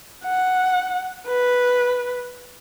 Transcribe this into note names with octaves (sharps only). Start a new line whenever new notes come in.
F#5
B4